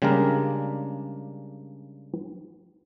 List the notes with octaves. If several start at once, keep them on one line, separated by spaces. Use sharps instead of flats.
C#3 G3 G#3 A#3 D4 A#4